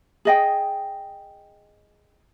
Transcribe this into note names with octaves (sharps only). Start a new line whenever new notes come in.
G#4 D#5 G5